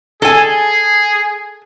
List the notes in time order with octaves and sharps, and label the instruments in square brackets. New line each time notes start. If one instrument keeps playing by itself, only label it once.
[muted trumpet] G#4 [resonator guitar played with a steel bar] A4 G#5